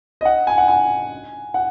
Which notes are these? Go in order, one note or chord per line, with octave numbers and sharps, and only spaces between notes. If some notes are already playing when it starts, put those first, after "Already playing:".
D#5
F#5
G#5
F#5
G#5
F#5